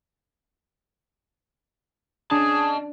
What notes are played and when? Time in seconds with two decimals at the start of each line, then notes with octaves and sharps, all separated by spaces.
2.31 D4 G#4 D#5 A5